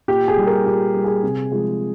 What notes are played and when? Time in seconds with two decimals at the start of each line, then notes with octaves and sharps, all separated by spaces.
0.08 A#2 G4
0.28 G#4
0.37 G3
0.46 A#4
0.65 A#2 G4
0.95 G3
1.04 G#4
1.23 C3
1.52 F3 G#3